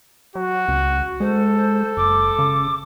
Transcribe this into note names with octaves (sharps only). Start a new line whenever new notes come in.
F#3 F#4
C#2
G#3 A4 C5
C5
F#1 D6
C#3